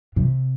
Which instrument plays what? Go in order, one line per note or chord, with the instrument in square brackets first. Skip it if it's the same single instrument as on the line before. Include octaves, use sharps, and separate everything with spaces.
[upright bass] C3